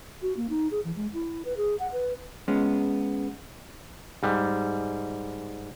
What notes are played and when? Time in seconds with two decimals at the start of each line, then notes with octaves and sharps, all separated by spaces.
0.22 F#4
0.37 A#3
0.50 D#4
0.71 G#4
0.84 E3
0.96 G#3
1.13 E4
1.45 B4
1.57 G#4
1.79 F#5
1.92 B4
2.48 G#3 B3 C#4
4.23 G#2 G3